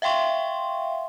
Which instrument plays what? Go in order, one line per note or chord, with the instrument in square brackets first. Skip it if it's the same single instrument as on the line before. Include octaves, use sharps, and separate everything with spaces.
[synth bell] E5 F5 G5 C6 C#6